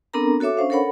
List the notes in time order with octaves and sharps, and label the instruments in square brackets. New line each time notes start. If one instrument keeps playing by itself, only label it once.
[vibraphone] B3 C4 D4 A4 A#4 A#5
F#4 A4 C#5 E5 D6
C#4 D4 C5 F5
A4 A#4 C#5 F#5 B5